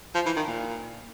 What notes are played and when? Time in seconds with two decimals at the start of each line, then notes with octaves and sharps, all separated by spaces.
0.15 F3
0.26 E3
0.36 D#3
0.47 A#2